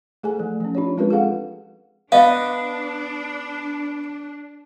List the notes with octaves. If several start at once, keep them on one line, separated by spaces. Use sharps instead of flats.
A3 G#4 A4 G#5
F3 A3
F3 C#4
D4 F4 G4 C#5
G#3 C4 F4 G4 A#4 B4
G#4 A4 F5 F#5
B3 D4 B4 D5 D#5 F5